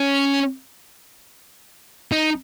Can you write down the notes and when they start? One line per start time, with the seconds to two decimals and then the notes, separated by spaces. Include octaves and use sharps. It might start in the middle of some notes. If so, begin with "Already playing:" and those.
Already playing: C#4
2.12 D#4